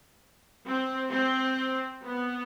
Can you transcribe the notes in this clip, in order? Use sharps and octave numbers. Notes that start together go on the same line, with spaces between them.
C4
C4
B3